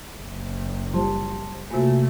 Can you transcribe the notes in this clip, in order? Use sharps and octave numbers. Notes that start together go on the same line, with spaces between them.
F#1
F3 G3 C5 A5 C6
C3 A3 A#3 F4 F#4 G#5